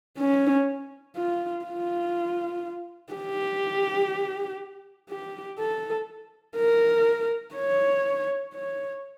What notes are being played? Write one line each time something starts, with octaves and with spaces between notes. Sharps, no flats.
C#4
F4
F4
G4
G4
A4
A#4
C#5
C#5